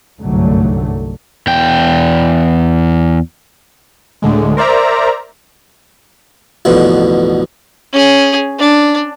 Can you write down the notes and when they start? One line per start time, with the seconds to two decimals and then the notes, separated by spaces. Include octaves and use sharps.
0.20 G1 C2 G#2 D3 F#3 A3
1.47 E2 G5
4.22 D2 A2 D3 G#3
4.57 A#4 C5 D5 E5 A#5
6.65 A1 F2 B2 D3
7.93 C#4 G#4
8.59 D4